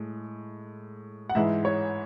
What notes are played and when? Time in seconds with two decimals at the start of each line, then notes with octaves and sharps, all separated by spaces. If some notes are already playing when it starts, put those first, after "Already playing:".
Already playing: A2 G#3
1.29 F#5
1.35 G#2 E3 G#3 E5
1.65 C#5